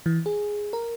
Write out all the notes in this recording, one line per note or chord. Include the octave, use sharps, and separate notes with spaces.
E3
G#4
A#4